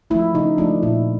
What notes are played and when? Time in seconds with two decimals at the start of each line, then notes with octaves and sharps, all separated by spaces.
0.10 F3 A3 E4
0.34 C#3 D#4
0.58 F3 A3 D4
0.83 A#2 E4